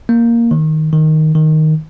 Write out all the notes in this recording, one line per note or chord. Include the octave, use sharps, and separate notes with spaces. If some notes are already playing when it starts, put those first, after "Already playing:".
A#3
D#3
D#3
D#3